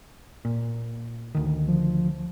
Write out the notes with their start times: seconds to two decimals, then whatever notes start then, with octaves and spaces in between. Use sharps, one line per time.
0.45 A#2
1.35 D2 D#3
1.68 F3